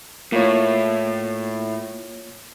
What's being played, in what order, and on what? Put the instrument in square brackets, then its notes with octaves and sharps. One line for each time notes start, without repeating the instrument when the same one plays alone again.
[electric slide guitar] A2 [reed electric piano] A#3 F4 C#5